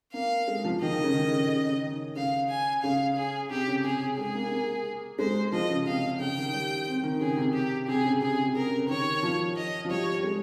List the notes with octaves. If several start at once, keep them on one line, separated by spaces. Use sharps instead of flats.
A#3 F5
G#3
F3
D#3 D#5
D#3
C#3
D#3
C#3
C#3
C#3
D#3
C#3 F5
G#5
C#3 F5
G#4
C3 G4
C#3
C3 G#4
G#3 G#4
A#3
A#3
G#3 C5
F3 D#5
C#3
C3 F5
C#3 G5
D#3
G3
C4
D#3
C#3 G#4
C3
G4
C3 G#4
C#3
C3 G#4
C#3
C3
C3 A#4
C#3
C#3
D#3 C#5
F3
D#5
F3
G3 C#5
G3
G#3